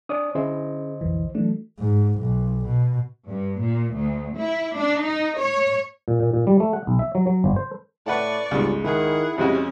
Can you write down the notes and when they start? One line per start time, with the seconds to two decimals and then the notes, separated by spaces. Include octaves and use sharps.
0.09 D4 C#5 D5 D#6
0.35 D3 C#4 E4 G#4 C5 D#5
1.01 B1 F2 E3
1.35 E3 F#3 A3 D4
1.79 G#2
2.19 B1
2.66 B2
3.29 G2
3.60 A#2
3.97 D2
4.38 E4
4.75 D4
5.04 D#4
5.38 C#5
6.08 A#2
6.20 A#2
6.33 A#2
6.47 G3
6.60 A3
6.73 F#5
6.87 B1
6.99 E5
7.15 F#3
7.27 F#3
7.44 G1
7.56 C5
8.06 A2 B4 D5 F#5 A5 C#6
8.51 G1 C#2 G#2 C#3
8.85 D#3 E4 G#4 F#5
9.38 F2 C3 G#3 C#4 F#4